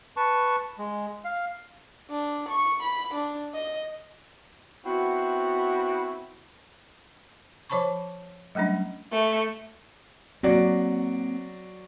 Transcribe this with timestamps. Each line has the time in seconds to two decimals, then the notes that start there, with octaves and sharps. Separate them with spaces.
0.17 B4 A5 C#6
0.78 G#3
1.25 F5
2.10 D4
2.49 C#6
2.83 B5
3.14 D4
3.54 D#5
4.86 B3 C4 E4 F#4
7.70 F3 C5 C#5 A5 B5 C#6
8.55 F#3 G3 A3 C#4 D4
9.12 A3
10.43 F#3 A#3 C4 F#4 D5